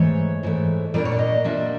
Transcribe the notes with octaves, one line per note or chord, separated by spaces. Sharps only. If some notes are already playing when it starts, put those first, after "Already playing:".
Already playing: G#2 E3 A3 C#5
G#2 E3 A3
A#2 G3 A#3 D4 D5
C#5
D5
D#5
A#2 G3 A#3 D4 E5